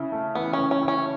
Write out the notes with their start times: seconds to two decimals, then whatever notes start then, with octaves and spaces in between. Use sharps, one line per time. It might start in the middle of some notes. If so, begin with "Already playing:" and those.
Already playing: C#3 E4
0.12 A3
0.35 E3 B3
0.53 C#4
0.59 C#3
0.71 C#4
0.83 E4
0.88 C#4